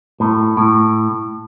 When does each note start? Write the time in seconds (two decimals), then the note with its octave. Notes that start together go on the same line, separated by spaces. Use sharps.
0.20 A2
0.57 A2